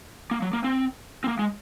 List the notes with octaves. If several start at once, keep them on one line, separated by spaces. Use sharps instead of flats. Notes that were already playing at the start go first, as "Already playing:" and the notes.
A#3
F#3
A#3
C4
C4
A#3
G#3